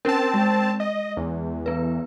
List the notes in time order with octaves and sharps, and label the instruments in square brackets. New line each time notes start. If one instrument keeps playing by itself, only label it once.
[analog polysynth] C4 A5 [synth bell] C#4 A#4
[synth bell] G#3
[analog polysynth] D#5
E2
[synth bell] B3 B4